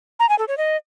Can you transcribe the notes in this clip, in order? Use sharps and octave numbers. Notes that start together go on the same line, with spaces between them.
A#5
G#5
A4
C#5
D#5